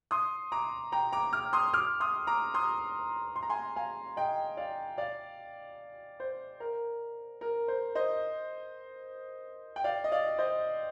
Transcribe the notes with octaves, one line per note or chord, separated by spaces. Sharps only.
C6 D#6
A#5 D6
G5 A#5
A#5 D6
D6 F6
C6 D#6
D6 F6
C6 D#6
A#5 D6
C6 D#6
C6
A#5
G#5 C6
F5 G#5
D#5 G5
D5 F5
D5 F5
C5
A#4
A#4
C5
C5 D#5
G5
D5 F5
D#5
D5 F5
C5 D#5